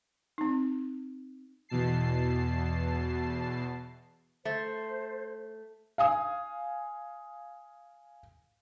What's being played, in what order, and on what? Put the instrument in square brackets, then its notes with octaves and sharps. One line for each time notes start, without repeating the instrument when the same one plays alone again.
[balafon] C4 D#4
[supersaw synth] E2 B2 A5 C7
[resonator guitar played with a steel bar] A3 [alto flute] C5
[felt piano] F5 G#5 D#6